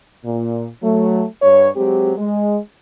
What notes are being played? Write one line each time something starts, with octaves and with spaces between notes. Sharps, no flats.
A#2
F#3 A3
G2 C#5
F#3 G#3 C4 G4
G#3